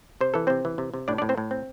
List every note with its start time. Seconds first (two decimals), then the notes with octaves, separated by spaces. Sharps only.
0.21 C3 C5
0.34 E3 A4
0.47 C3 C4 C5
0.65 E3
0.78 C3
0.94 C3
1.08 A2 D4 D5
1.18 D4 D5
1.22 A2
1.29 C4 C5
1.37 A2
1.51 C4